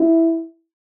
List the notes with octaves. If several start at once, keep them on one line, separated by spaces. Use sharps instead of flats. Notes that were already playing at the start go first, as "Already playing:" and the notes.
Already playing: E4